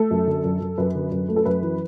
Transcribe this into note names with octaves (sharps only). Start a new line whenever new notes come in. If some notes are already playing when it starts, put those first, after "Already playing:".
Already playing: A3 A4
F#2
D3
F#2
F#2
F#2 B4
D3
F#2
A3
A4
F#2 B4
E3